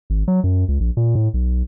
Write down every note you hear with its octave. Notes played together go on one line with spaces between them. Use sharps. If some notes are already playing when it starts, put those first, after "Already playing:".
G#1
F#3
F#2
C#2
A#1
A#2
A2
B1